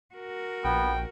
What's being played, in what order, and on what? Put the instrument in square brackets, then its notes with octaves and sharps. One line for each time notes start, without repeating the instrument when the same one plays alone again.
[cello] F#4 A#4
[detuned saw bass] A#1 [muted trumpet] B3 [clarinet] G5